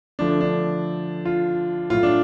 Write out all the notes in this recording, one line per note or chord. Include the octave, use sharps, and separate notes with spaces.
D3 F3 A3 D4
D4
F4
A2 F#3 A3 F4
D4